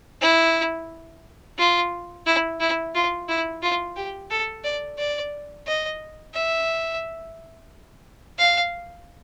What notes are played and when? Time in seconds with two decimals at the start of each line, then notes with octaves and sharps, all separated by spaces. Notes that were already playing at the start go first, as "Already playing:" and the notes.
0.22 E4
1.58 F4
2.26 E4
2.60 E4
2.95 F4
3.29 E4
3.62 F4
3.96 G4
4.31 A4
4.64 D5
4.99 D5
5.67 D#5
6.35 E5
8.38 F5